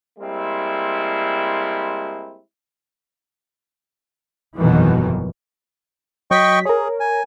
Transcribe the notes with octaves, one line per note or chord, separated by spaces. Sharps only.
G3 G#3 A#3 C4 E4
G1 F2 B2 D#3 E3 F#3
F#3 D#5 G5 C#6 B6
G#4 A#4 C#5
G#5